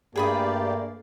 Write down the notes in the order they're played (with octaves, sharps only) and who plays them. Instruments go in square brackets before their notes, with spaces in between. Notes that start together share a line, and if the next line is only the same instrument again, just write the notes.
[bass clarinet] G2 [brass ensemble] A3 A#3 [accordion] G4 D5 [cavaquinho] G#4 B5 D#6